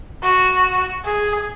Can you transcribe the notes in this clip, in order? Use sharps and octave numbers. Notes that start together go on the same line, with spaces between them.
F#4
G#4